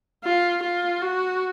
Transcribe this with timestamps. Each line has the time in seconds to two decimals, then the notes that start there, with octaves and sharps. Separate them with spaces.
0.24 F4
0.63 F4
1.01 F#4